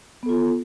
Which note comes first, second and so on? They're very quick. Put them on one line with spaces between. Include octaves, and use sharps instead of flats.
B3 A4 F4